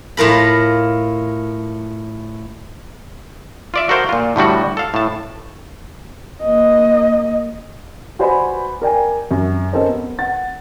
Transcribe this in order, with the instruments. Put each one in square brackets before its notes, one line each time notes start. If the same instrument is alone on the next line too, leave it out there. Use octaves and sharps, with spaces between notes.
[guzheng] A2 F4 A#4 B5
[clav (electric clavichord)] F4 D5 E5
F#4 A4 A#4 C5 F5 F#5
A#2 F4
A2 D3 G3 F#4
A4 F5
A2 A5
[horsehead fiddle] A#3 D#5
[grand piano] F#4 B4 C5 D5 G#5 B5
A#4 D5 G5 G#5
F#2
C#4 A4 A#4 C5 D#5
B3
F#5 A6